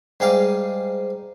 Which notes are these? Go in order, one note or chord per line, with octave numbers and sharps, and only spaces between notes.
G#2 G3 G#4 F5 D6